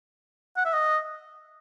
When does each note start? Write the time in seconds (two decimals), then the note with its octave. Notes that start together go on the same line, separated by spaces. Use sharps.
0.57 F#5
0.65 E5
0.73 D#5